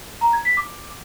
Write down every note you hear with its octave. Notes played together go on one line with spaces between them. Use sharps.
A#5
G#6
B6
D6